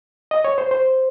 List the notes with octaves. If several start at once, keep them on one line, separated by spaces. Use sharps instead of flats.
D#5
C#5
C5
C5